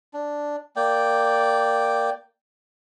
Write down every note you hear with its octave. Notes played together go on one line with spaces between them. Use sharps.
D4
A#3 D5 G5